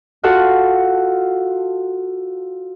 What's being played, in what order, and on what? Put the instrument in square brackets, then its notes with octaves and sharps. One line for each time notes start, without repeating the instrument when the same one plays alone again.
[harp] F4 F#4 A4 F5 F#5